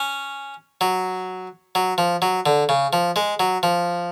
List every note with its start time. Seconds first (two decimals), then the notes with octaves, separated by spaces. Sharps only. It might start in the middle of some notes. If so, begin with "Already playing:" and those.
Already playing: C#4
0.81 F#3
1.75 F#3
1.98 F3
2.22 F#3
2.46 D3
2.69 C#3
2.93 F3
3.16 G#3
3.40 F#3
3.63 F3